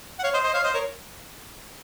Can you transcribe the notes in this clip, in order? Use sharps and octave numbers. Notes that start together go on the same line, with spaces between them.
F#5
C#5 F5
C5 D#5
C5 D#5
C#5 F5
C5 D#5
A#4 C#5